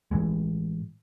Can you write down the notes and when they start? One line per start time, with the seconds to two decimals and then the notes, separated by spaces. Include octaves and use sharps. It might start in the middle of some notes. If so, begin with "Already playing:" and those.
0.11 A2 E3 G#3